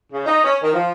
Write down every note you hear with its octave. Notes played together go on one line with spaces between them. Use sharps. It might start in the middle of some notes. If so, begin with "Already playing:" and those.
C#3
D#4
C#4
D#3
F3